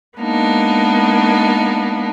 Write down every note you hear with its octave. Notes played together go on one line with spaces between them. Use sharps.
G#3 A#3 B3 D4 D#4